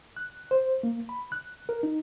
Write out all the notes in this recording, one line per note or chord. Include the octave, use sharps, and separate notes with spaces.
F#6
C5
A#3
B5
F#6
A#4
D#4